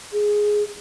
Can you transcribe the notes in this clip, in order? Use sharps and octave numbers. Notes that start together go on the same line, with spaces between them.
G#4